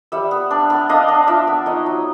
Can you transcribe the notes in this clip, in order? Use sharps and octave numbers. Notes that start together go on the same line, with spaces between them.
G3 E5 F#5
B3
D4
B3
D4 D#5 F5
D4
F4 D5 E5
B3
D#4 C#5 D#5
F#3